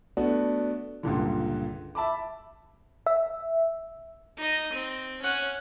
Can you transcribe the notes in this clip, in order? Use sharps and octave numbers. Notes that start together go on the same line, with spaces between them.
A3 B3 D4 F#4
C#2 G2 A#2 D3
E5 A5 B5 D6
E5
D#4 D#5
C4
C#4 F#5